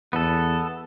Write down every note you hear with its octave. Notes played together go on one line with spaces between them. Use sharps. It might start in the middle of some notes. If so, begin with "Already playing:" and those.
E2 B3 A4